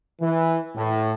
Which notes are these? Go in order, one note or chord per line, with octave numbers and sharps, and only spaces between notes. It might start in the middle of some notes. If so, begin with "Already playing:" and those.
E3
A2